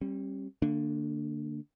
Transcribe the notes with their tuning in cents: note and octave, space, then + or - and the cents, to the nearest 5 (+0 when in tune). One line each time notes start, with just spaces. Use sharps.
G3 +0 C#4 -45
D3 +0 A#3 -45 D4 +0